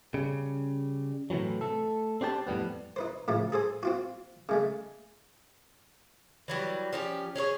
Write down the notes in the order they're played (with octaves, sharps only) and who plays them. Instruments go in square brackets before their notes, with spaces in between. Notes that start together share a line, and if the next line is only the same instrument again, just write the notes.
[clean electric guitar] C#3 G3
A2 C3 D#3 E3 F#3
A3 A4
C4 D4 G4 C5 A5
F2 A2 G3 B3
[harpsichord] D#4 B4 C5
A2 C#3 F3 A3
G#4 A4 C5 G#5
C4 F4 F#4
C#3 G#3 A3
[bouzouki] E3 F#3 G3
F3 C#4 G4
C#4 G#4 A4 C#5